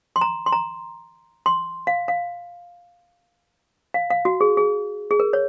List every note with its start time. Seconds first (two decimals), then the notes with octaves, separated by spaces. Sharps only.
0.16 C6
0.21 A#5
0.46 C6
0.52 A#5
1.46 C6
1.87 F5
2.08 F5
3.94 F5
4.11 F5
4.25 F#4
4.41 G#4
4.57 G#4
5.11 G#4
5.20 A#4
5.33 C#5